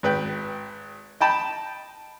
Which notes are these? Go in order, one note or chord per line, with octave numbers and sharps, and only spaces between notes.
G#1 B4 G5
D#5 G5 A5 B5